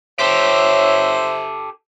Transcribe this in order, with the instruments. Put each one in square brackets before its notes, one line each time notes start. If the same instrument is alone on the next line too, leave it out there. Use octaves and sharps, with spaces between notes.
[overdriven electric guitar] G4 A4 [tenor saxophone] C5 [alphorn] C#5 [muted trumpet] E5